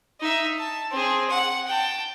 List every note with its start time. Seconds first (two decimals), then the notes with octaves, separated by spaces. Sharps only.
0.20 D#4 E5
0.58 A5
0.91 C4 G#4
1.29 F#5
1.67 G5 A5